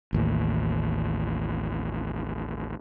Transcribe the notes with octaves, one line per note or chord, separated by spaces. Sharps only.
A1 D#2 A2